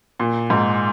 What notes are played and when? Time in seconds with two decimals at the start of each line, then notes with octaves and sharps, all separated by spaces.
0.20 A#2
0.50 G#2